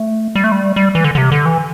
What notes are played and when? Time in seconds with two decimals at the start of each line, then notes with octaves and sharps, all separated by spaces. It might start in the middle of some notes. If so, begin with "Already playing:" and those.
Already playing: A3
0.35 G3
0.44 A3
0.52 G3
0.76 G3
0.95 E3
1.04 D3
1.15 D3
1.18 C3
1.32 D3
1.46 E3